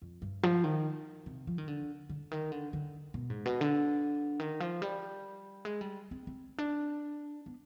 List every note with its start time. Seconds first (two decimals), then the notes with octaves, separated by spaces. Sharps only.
0.02 F2
0.22 G2
0.43 F3
0.64 D#3
1.26 C3
1.47 F3
1.58 D#3
1.68 D3
2.09 D3
2.31 D#3
2.52 D3
2.73 D3
3.14 B2
3.30 G#2
3.46 B2
3.61 D3
4.40 D#3
4.60 F3
4.82 G3
5.65 G#3
5.81 G3
6.11 C4
6.27 C4
6.58 D4
7.46 B3